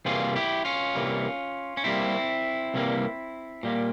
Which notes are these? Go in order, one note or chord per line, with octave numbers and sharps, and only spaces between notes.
C2 C3 E3 G3 A#3 F4 G#4
E4 G4
C#4 F4
C2 C3 E3 G3 A#3
C#4
C2 C3 E3 G3 A#3 C4 E4
C2 C3 E3 G3 A#3
A#2 G3 A#3